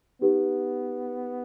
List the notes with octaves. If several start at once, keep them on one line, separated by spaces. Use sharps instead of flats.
B3 D#4 G4 B4